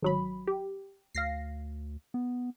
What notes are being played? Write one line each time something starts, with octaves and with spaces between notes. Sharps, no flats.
G#1 F#3 B5
G4
D2 F5 A#6 C7
B3